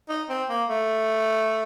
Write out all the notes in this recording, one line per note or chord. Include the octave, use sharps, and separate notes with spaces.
D#4
C4
A#3
A3